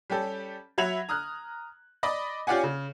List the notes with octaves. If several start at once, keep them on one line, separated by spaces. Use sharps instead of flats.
G3 C#4 G4 A4
F#3 E5 F#5 B5 G#6 F7
A#5 D#6 F6 F#6
D5 D#5 B5 D6
C#4 F4 G4 D5 F#5 G#5
C#3